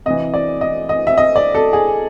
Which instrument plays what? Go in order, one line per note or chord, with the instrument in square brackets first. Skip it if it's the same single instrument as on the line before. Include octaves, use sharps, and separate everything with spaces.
[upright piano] C3 E3 D#5
D5
D#5
D#5
E5
D#5
D5
A4
G#4